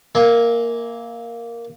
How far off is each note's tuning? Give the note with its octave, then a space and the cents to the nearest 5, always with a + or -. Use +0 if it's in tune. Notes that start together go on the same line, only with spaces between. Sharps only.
A#3 +0 E5 -25 G#5 +0